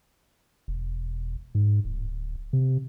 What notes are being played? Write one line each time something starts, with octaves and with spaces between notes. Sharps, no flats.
E1
G#2
D1
C3